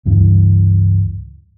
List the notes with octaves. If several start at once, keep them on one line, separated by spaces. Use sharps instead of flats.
C#2 G2 E3